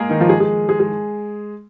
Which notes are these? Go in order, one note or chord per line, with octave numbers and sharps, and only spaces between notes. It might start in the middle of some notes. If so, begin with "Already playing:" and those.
Already playing: G#3 A#3 G#4 A#4
D#3 D#4
F3 F4
G#3 G#4
G#3 G#4
G#3 G#4
G#3 G#4